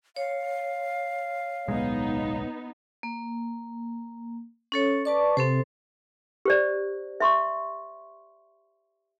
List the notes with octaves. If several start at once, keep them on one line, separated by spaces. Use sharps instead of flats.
C#5 F5
D1 B1 G#3 B3 D#4
A#3
C#4 A4 C#5
B4 D5 A5 C#6
C3 C4 A4 C5
G4 C5 D5
E5 C6 C#6